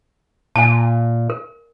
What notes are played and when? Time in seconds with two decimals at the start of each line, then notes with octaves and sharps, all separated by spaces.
0.56 A#2 G#5 A5
1.30 A#4